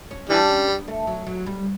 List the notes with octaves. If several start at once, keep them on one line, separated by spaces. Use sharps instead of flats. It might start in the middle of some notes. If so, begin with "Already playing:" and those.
C#4
E3 G3 D4
C#4
B3
A3
F#3
F#3
G3